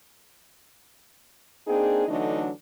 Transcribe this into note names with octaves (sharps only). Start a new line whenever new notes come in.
A#3 C4 D4 D#4 G#4
D3 E3 F#3 A3 D4 D#4